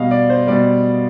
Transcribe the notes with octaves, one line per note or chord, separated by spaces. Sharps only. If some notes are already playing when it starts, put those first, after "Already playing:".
Already playing: B2 G3 D#5 F5
D5
C5
B2 G3 D5